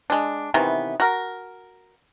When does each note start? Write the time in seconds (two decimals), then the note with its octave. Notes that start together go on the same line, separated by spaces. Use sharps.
0.10 G#3 D4
0.54 C3 D#3 E3 B3
1.00 F#4 A#4